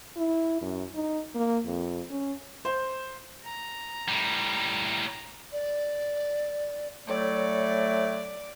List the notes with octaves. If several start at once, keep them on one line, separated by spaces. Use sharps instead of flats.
E4
F#2
D#4
A#3
F2
C#4
C5
A#5
A2 G3
D5
A2 F#3 A3 D5